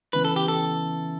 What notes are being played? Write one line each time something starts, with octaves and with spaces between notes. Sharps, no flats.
C#3 E3 B3 B4
A4
G4
A4